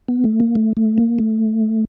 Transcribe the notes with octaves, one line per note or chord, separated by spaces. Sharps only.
B3
A3
A#3
A3
A3
A#3
A3